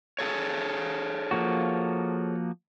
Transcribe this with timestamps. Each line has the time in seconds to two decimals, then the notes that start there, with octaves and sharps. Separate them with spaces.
0.19 G#4 A4 C#5
1.31 F3 A#3 F#4